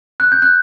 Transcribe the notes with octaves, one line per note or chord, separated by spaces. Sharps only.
F#6
G6
F#6